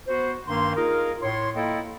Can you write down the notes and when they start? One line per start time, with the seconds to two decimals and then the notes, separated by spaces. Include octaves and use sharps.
0.08 B3 F#4 C5
0.48 G2 D#3 A#3 D#4 C6
0.75 D#4 F4 G#4 A#4
1.22 A2 C#5 C6
1.56 A#3 E4 F4 A4 D#5 G5